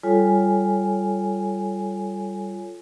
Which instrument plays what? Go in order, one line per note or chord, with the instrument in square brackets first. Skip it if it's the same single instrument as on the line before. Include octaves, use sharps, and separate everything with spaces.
[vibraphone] G3 F4 A4 C#5 G#5